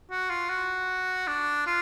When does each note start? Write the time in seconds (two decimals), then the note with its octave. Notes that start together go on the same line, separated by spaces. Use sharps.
0.11 F#4
0.30 F4
0.50 F#4
1.28 D4
1.66 F4